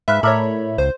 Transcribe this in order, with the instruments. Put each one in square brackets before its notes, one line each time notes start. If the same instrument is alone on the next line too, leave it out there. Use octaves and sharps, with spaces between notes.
[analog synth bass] G#2 [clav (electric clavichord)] B4 F5 [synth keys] E5
[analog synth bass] A2 [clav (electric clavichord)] A4 A#4 D5 [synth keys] C#5 E5 B5
[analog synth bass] C#2 [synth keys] C5